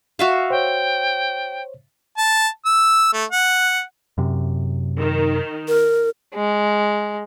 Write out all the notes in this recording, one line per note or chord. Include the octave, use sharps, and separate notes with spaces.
F#4 E5 F5
C5 C#5 G5
A5
E6
A3
F#5
F#2 C3
D#3
A#4
G#3